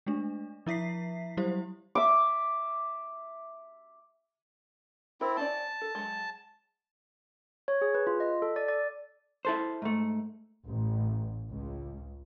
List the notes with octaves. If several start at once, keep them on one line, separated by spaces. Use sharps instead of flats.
G#3 A3 D4
F3 E4 E5 B6 C7
F#3 G3 E4 G4 C5
E5 D6
C4 E4 A#4
C4 C#4 D5 A5
A4
F#3 G#3
C#5
G#4
B4
F4
D#5
A4
D5
D5
E4 A4 C5
G#2 A3
A1
C#2